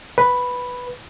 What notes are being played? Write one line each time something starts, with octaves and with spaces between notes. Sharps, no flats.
B4